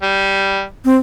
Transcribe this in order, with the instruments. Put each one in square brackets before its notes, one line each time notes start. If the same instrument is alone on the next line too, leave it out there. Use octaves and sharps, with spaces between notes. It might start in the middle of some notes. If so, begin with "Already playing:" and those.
[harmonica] G3
[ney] C4